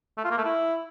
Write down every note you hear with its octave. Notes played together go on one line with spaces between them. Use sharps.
A3
F4
A#3
A3
E4